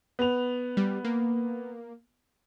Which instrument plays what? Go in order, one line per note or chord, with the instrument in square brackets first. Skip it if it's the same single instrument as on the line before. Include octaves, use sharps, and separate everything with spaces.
[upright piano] B3 F7
[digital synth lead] G3
A#3